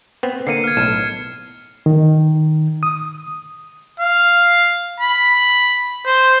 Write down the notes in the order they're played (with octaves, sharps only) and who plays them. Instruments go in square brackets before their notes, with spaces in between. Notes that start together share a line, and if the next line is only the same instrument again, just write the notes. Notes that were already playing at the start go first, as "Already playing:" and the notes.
[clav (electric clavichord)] B3 C4
[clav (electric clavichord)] D3 A#3 [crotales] C7 C#7 D#7
[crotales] F6 G#6
[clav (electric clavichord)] B1 A2 [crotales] F6 E7
[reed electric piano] D#3
D#6
[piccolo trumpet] F5
B5
C5